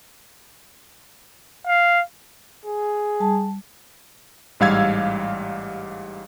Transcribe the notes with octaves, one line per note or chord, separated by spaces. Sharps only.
F5
G#4
G3 A5
A1 G#2 G3 F5 E6 G#6